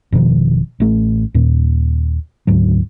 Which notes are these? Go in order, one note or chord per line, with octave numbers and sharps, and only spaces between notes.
F1 B2 D#3 F3
A1 A3
D#2 A#2
D2 G#2 F#3